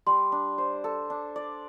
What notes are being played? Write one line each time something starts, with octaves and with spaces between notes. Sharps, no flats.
G3 C6
D4
C5
A4
D4
D5